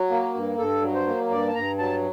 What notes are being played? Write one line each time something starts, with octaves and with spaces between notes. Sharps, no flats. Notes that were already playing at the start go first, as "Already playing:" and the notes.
Already playing: F#3
A#3
G2
G2 A4
F#3
C5
A#3
G2 D5
A5
G2 A#5
F#3 A5